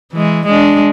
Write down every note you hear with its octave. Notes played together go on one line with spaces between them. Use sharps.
E3 G#3
G#3 D4